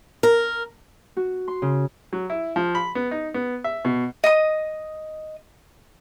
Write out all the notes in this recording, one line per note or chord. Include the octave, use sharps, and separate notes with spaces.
A#4
F#4
C6
C#3
F#3
E4
F3
B5
B3
D#4
B3
E5
B2
D#5 D#6